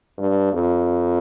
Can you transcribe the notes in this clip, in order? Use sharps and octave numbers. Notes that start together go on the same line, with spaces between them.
G2
F2